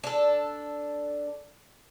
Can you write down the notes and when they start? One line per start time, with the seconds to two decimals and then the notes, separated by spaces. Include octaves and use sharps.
0.04 D4 A4